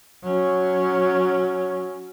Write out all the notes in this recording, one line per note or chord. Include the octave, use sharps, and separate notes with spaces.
F#3 C#4